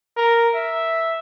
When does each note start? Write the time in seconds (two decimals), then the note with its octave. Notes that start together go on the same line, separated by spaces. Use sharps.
0.17 A#4
0.54 E5